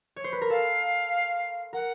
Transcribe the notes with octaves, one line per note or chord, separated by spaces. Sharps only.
C#5
C5
B4
A#4
A4 F5
A#4 F#5